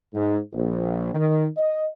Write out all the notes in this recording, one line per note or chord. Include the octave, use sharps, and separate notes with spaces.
G#2
A#1
D#3
D#5